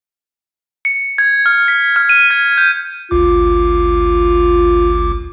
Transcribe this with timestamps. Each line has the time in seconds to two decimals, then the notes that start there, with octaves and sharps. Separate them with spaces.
0.85 C#7
1.18 G#6
1.46 F6
1.68 B6
1.96 F6
2.09 D#7
2.31 G#6
2.58 G6
3.11 G#1 D2 F4 D6